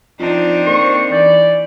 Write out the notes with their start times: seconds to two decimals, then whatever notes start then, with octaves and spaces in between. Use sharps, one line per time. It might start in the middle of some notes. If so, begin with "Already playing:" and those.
0.19 F3 C4 D4 D#4
0.66 A#3 C5 C#6
1.12 E3 D5 G6